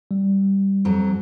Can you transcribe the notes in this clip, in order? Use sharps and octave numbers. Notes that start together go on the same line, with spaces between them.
G3
F2 F#3